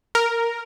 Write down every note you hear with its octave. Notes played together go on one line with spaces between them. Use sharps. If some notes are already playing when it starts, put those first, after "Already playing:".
A#4